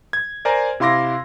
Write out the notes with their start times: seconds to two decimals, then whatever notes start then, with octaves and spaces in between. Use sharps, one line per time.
0.13 G#6
0.45 A#4 C5 D5 G#5 A#5 G#6
0.80 C3 E4 F5 C6 D6 A#6